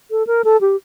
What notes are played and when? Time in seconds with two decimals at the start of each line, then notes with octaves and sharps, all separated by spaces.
0.11 A4
0.27 A#4
0.45 A4
0.61 G4